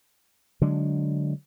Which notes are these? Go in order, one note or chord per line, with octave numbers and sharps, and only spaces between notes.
D3 F#3 G#3 D4